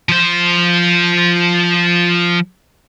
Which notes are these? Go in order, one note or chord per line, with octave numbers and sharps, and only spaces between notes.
F3 C5